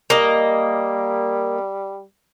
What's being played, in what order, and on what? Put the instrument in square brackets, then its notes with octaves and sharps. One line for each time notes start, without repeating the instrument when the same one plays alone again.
[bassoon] G3 [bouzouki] A#3 D#5